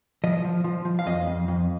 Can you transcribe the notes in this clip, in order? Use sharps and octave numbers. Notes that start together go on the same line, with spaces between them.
F3 D#5
F3
F3
F3
F5
F2 D#5
F2
F2